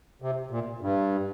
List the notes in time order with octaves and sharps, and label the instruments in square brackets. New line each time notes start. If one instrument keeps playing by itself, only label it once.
[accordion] C3
A#2
G2